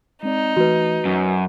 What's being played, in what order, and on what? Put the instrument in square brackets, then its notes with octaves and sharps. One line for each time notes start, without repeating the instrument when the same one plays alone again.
[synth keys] G#3 C4 D5 [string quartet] D#4
[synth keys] E3 A3 [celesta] F#4 B4
[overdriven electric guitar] F#2 [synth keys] C#4